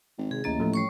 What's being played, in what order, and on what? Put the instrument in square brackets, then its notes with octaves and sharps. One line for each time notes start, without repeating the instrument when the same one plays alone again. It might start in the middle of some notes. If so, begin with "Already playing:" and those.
[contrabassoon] G#1
[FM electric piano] C3 [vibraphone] G#4
[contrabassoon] A1 [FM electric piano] D2 A6 [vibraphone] A#3 D#5
[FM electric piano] A2 F3 A3
[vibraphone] G3 C#5 C#6